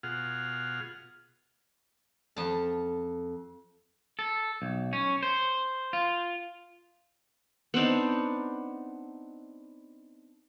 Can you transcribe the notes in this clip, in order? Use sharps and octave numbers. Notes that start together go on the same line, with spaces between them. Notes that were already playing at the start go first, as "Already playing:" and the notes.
B2 F4 G#4 F#5 F6
F2 A5
A4
B1
C#4
C5
F4
B3 C4 D4 D#4